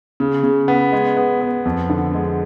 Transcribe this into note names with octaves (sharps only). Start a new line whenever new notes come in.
C#3
C#3
B3
G#3
B3
B3
F2
D3
G#3